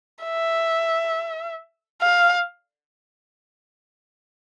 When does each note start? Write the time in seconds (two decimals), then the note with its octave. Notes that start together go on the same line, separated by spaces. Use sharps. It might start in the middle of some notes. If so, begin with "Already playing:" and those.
0.25 E5
2.01 F5